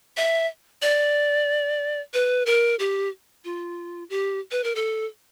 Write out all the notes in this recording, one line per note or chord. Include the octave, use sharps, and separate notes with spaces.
E5
D5
B4
A#4
G4
F4
G4
B4
A#4
A4